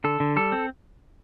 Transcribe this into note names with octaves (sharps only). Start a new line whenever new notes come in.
D3 A4
D3
G3 A4
C4